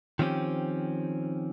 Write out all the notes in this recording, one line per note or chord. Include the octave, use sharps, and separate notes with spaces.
D#3 F3 C4 C#4 G4